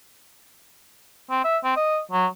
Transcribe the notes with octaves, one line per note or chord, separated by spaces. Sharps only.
C4
E5
C4
D#5
F#3